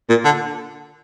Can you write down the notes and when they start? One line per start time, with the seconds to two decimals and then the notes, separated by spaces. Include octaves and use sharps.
0.10 A#2
0.25 D3